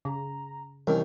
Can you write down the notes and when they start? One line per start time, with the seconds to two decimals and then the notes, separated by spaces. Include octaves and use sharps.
0.05 C#3 A#5
0.87 C2 D#3 E3 C#4 A#4